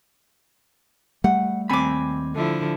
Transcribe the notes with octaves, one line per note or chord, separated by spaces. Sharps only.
G3 A3 F#5
D#2 C4 G#5 B5 D6
D3 F3 E4